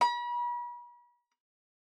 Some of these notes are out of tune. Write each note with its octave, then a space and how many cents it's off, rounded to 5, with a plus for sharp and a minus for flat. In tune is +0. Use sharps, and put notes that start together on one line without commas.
B5 -40